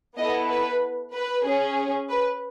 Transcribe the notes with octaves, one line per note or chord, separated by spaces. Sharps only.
B3 E4 A4 D#5
B4
B4
C#4 G#4
B4